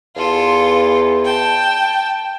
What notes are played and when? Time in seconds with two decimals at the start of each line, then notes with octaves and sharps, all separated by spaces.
0.16 E2 F4 A4
1.24 G5 A5